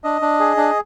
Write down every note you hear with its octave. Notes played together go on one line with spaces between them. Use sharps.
D4 D#5
D4
G#4
D4